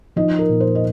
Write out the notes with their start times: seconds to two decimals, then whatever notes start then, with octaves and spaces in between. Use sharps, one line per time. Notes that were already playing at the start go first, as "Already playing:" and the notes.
0.16 F3 D#4 D#5
0.39 A#4
0.49 A#2
0.60 C5
0.75 D#5